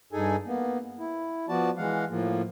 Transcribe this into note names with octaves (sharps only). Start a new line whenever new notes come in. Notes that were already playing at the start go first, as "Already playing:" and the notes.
G2 D#4 G#4 A4 G#5
A#3 B3
E4
F3 B3 F#4 D5 A5
E3 G#3 F5 F#5
A2 F3 A#3